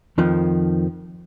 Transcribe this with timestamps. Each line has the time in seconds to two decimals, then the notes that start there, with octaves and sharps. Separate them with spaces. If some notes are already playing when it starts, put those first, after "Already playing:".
0.18 F2 D#3 F3